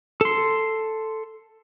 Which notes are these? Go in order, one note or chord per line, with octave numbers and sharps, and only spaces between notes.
A4 C6